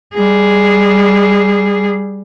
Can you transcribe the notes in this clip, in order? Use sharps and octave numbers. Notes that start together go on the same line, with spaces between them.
G3 G#4